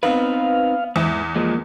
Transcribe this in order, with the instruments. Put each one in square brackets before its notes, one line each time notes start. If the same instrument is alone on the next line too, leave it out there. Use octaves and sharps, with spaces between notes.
[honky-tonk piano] B3 [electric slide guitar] C4 D#4 B4 [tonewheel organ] F5
[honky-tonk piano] E2 [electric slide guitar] G#2 E4
[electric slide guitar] F3 G#3 [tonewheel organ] A#3